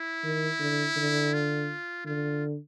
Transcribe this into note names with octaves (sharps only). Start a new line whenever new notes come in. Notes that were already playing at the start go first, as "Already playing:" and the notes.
Already playing: E4
D#3
D3
D3
F4
D3 F4